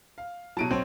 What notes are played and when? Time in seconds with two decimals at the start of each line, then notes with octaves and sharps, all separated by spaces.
0.18 F5
0.57 B2 F#3 A5 D7 D#7
0.71 B1 C4 C#5